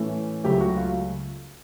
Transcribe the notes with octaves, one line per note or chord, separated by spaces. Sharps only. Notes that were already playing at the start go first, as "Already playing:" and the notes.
Already playing: A2 E3 A3 C#4
C#2 C#3 F#3 A3 G4
F#4
F4